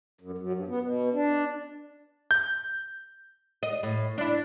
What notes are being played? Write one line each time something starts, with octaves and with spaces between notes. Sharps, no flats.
F#2
F#2
G2
B3
B2
D4
G6
D#5
A2
D4 E4